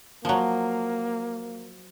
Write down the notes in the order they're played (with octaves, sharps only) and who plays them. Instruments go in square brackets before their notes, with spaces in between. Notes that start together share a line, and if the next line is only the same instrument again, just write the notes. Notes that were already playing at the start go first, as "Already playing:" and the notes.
[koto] F3 F#3 [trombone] A#3